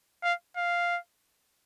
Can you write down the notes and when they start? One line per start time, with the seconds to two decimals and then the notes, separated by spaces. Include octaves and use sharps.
0.23 F5
0.57 F5